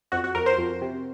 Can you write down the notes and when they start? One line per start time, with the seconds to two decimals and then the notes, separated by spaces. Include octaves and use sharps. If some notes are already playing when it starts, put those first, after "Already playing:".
0.12 F2 F#4
0.24 F#4
0.35 F2 A#4
0.46 C5
0.58 F2
0.81 C3